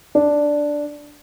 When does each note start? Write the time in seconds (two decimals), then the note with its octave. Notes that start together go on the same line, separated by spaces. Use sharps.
0.15 D4